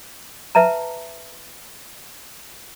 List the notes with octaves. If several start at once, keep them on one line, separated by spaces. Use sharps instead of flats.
B4 E5 A5 A#5